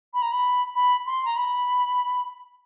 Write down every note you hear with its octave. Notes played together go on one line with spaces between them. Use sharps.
B5
A#5
B5
B5
C6
A#5
B5